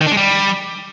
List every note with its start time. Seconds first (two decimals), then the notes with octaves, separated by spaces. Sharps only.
0.01 D#3
0.06 D4
0.12 G#3
0.17 G3